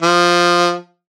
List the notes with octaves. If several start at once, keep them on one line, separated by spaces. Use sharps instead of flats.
F3